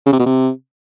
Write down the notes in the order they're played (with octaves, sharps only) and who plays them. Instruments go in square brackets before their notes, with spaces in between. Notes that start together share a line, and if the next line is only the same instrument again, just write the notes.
[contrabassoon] C#3
C3
B2
C3